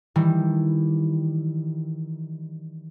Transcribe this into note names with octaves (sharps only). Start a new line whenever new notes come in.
D#3 E3 G3